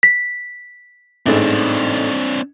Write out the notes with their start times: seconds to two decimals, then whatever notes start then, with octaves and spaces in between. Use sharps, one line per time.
0.03 B6
1.26 A1 G#2 A3 C4 D4